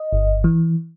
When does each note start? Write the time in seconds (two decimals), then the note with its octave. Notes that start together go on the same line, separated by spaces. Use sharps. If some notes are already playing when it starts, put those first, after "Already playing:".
Already playing: D#5
0.13 G1
0.44 E3